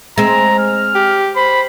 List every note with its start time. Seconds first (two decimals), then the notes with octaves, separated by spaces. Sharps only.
0.18 G#3 C4 A#5
0.59 F6
0.95 G4
1.36 C5 B5